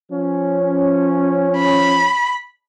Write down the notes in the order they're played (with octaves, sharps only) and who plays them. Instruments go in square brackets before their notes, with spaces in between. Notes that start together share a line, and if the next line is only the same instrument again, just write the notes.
[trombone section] F3 C#4
[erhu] B5